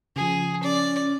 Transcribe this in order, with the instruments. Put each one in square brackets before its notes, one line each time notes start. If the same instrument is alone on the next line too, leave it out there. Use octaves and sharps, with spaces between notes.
[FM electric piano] C#3 F3 [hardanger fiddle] G#4
[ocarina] C#4 [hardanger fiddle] D5